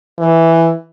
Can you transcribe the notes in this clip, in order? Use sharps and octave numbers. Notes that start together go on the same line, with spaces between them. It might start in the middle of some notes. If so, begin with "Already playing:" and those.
E3